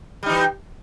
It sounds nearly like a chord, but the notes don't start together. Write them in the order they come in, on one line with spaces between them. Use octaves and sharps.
G3 D#4 E3